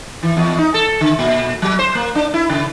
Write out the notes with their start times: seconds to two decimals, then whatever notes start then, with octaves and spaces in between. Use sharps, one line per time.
0.23 E3
0.37 E2
0.58 D#4
0.74 A4
1.01 D3
1.19 A#2
1.62 F#3
1.79 C5
1.95 A#3
2.15 D4
2.34 E4
2.49 C#3